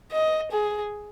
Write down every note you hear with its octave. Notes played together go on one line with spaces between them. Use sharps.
D#5
G#4